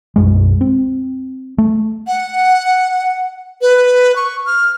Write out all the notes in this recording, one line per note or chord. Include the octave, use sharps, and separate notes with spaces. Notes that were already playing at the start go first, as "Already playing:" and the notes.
B1 F#2 G#3
C4
A3
F#5
B4
C#6
F6